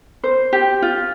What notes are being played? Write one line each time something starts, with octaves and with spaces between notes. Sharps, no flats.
C5
G4
F4